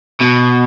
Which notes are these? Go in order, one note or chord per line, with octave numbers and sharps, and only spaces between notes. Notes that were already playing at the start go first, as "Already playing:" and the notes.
B2